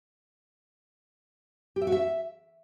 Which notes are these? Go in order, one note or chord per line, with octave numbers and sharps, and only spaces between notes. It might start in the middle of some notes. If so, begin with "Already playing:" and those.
G4
E5
F#4
E5